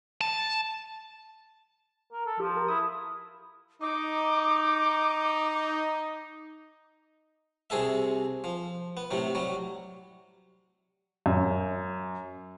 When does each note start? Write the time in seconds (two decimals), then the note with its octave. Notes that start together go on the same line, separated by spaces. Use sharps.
0.21 A5
2.12 A#4
2.26 A4
2.40 F3 G4
2.57 A#4
2.68 E4 D#6
3.81 D#4 D6
7.70 C2 C3 G#4 A4 E5
8.44 F3
8.97 B3
9.11 A2 C3 F#3
9.35 F#3 G3
11.26 F#2